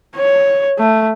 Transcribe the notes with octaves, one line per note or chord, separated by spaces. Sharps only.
C#5
A3